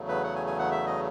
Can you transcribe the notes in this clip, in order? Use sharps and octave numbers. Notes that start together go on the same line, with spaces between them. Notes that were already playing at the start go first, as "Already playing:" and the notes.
Already playing: E2 C#3 F#3 A3
B4
F#5
G#5
G#5
F#5
E5
D#5